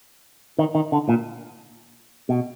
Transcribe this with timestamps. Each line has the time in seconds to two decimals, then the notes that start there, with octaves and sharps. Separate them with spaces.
0.59 D#3
0.75 D#3
0.92 D3
1.09 A#2
2.29 B2